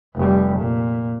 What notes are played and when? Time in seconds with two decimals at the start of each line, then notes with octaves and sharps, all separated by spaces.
0.16 F1 G3
0.59 A#2